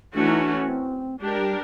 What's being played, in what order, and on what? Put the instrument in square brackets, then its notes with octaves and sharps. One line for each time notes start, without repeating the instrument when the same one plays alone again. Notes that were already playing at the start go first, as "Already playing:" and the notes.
[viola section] E3 A3 C#4 F#4 [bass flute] D4
[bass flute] D#4
D4
C#4
C4
[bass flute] G#3 [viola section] D4 G4 A#4
[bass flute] G3